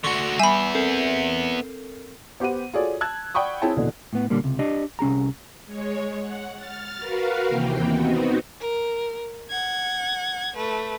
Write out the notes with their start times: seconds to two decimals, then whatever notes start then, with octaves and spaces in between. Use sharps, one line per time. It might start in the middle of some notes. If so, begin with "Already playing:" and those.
0.04 D3 F#4 C6 C#6
0.40 G3 B3 E5 G#5 B5 C7
0.75 C4 A4 A#4
2.40 B3 G4 C5 F#5 D#7
2.73 F4 F#4 G#4 A4 C#5 D5
3.01 A5 E6 F#6 G#6
3.34 D5 F#5 G5 B5 C#6 D#6
3.62 C4 E4 G#4 C#5 G5 A5
3.76 D#1 B2 D3 E3
4.13 A2 B3
4.30 A#2 D3 G3 A#3 C#4
4.44 C#2 C3
4.59 D4 G4 D5 D#5
4.99 C2 C#4 G#4 A#5
5.66 G#3 C#5
6.20 F#5
6.55 F6 A6
6.97 F#4 A#4 B4 F5
7.48 D#2 C3 E3 A#3 G5
7.87 B3 C4 D#4 F#4
8.60 A#4
9.49 F#5 G#6
10.56 A3 B4